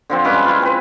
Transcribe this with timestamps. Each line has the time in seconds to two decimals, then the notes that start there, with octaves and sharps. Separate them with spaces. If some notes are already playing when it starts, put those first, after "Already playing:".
0.10 D3 F3 C4
0.24 G3 G#3 C#4 B4
0.45 E4 F4
0.62 C4 B4